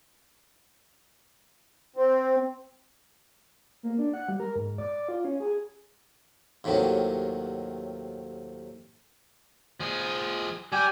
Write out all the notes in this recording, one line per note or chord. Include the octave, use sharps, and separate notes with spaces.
C4
A#3
D4
F#5
G3
A#4
G#2
D5
F4
C#4
G#4
D#2 A2 C3 D#3 F#3
F3 G#4
G3 G4 G#5